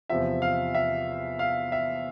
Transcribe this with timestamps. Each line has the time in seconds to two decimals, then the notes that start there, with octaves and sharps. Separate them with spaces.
0.09 E2 C3 F3 E5
0.42 F5
0.74 E5
1.39 F5
1.72 E5